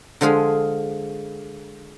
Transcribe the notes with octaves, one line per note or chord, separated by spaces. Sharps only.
D3 F3 G#3 F4 G#4